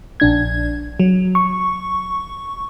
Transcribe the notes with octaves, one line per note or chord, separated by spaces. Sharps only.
A#1 D4 G#6
F#3
C#6